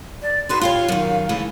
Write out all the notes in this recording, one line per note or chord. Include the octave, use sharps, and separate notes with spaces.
D5
D#4 F#4 B4 C6
F4 G4 C#5 F5
F#2 D#3
C#3 E3 A3